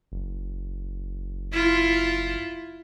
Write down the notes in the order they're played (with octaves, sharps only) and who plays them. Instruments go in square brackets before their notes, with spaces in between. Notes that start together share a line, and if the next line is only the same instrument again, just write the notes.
[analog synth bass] F#1
[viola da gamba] E4 F4